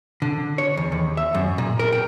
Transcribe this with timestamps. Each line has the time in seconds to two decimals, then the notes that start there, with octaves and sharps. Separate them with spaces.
0.22 D3
0.58 C#5
0.77 E2
0.92 D#2
1.17 E5
1.34 F#2
1.58 A#2
1.79 A#4
1.92 G5